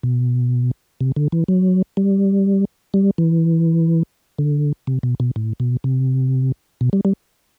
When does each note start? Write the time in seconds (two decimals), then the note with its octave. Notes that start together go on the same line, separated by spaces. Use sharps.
0.03 B2
1.01 C3
1.16 D3
1.32 E3
1.48 F#3
1.97 G3
2.94 G3
3.18 E3
4.39 D3
4.87 C3
5.03 B2
5.20 B2
5.36 A2
5.60 B2
5.84 C3
6.81 B2
6.93 G3
7.05 G3